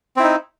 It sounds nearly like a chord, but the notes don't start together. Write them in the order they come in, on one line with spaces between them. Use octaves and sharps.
C4 E4 D#4